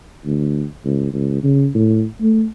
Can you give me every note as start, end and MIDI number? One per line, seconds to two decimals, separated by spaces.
0.25 0.64 38
0.85 1.10 37
1.14 1.39 37
1.43 1.68 49
1.74 2.04 45
2.21 2.45 57